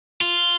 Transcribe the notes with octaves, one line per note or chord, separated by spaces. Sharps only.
F4